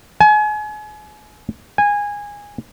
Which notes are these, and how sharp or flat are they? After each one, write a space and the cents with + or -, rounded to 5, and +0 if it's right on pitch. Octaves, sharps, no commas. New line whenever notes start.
G#5 +35
G#5 -15